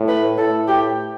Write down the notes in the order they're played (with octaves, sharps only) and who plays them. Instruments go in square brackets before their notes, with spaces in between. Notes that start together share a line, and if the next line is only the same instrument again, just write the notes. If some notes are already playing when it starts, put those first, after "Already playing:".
Already playing: [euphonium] A2
[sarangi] B4
[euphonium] A2 [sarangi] A4
[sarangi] G4